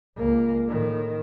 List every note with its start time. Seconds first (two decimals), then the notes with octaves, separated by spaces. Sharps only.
0.16 C#2 A#3
0.67 A2 D#3